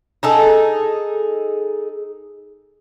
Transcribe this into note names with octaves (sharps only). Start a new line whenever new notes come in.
D#4 G#4 A4